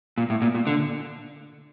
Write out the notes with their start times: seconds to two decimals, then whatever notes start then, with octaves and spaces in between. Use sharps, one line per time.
0.18 A#2
0.30 A2
0.42 A#2
0.55 A#2
0.67 D3